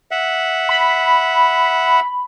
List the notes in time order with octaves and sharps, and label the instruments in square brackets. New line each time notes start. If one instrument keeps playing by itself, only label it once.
[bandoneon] E5 F#5
[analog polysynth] B5